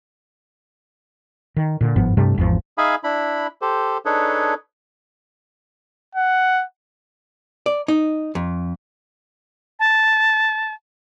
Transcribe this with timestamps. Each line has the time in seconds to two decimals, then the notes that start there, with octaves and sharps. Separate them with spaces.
1.56 D#3
1.81 A#2 D3
1.96 G1 G#2 F3 B3
2.17 G2 C3 G3 A3
2.38 G#1 E2 F3
2.78 D#4 G#4 E5 F5 G#5 B5
3.04 D4 E4 B5
3.62 G4 A4 C5
4.05 D4 D#4 G#4 A4 B4 C#5
6.15 F#5
7.66 D5
7.88 D#4
8.35 F2
9.79 A5